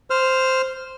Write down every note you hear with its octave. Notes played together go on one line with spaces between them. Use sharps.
C5 F6